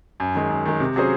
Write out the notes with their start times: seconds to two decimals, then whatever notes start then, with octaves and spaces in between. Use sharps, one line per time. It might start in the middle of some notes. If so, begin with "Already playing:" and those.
0.20 F#2
0.35 D#3 G#3
0.51 F#2
0.65 D#3 G#3
0.80 C3
0.96 F#3 C#4 G#4 C5